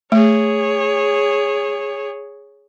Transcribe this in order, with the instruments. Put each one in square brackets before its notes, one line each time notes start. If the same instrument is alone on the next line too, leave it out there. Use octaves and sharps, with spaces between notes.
[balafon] A3 [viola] G#4 C#5